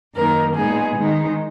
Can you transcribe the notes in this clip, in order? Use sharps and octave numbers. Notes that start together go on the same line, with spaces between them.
F#2 D#3 A#3 D#4 A#4
A#2 G#3 B3 D#4 G#4
D#3 G#3 D#4